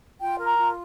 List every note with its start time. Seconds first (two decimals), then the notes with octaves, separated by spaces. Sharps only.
0.21 F4 G5
0.39 A#4
0.45 A#5
0.58 F4